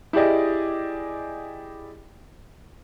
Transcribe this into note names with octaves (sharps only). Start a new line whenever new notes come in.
E4 G4 G#4 D5 D#5